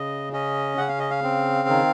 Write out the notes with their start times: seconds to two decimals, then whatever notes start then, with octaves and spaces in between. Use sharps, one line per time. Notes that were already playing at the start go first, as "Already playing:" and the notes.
Already playing: C#3 D#5
0.33 C#4 D#5
0.78 C#3 F#5
0.88 F5
0.99 D#5
1.10 F5
1.23 C4
1.68 D#3